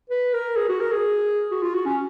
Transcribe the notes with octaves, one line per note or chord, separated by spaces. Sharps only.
B4
A#4
G#4
F#4
A#4
G#4
F#4
F4
F#4
C#4